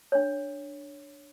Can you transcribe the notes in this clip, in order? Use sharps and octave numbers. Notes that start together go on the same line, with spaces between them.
D4 C#5